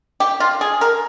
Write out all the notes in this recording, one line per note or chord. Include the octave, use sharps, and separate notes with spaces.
G4
F4
G#4
A#4